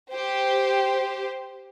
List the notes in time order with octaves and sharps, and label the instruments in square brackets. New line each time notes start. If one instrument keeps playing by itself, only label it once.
[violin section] G4 C5